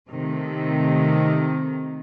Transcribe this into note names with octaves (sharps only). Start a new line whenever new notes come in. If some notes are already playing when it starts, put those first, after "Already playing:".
C3 D#3 A3